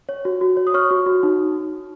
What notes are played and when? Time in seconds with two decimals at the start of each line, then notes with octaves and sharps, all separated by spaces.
0.09 C#5
0.25 F#4
0.41 F#4
0.57 C#5
0.67 D#6
0.74 C#5 C#6 F6
0.91 F#4
1.06 F#4
1.23 D#4